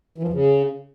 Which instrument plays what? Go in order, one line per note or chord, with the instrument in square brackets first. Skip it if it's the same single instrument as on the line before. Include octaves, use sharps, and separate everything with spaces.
[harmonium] E3
F3
E2
C#3